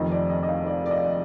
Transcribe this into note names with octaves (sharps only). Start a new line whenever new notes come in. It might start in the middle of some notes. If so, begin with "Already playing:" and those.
Already playing: F1 F2 D#3 D#5
D5
D#5
D#5
F5
D5
D5
D#5